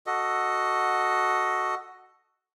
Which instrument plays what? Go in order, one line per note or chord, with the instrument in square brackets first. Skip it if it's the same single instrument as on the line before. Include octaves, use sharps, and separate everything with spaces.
[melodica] F#4 A4 D#5